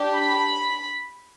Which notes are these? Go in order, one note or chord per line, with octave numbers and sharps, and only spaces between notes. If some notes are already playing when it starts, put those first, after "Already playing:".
Already playing: D4 G4
B5